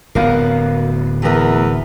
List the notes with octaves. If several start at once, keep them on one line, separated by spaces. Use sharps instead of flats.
D1 B3 A#4 F5 F#5
E2 E3 A3 A#4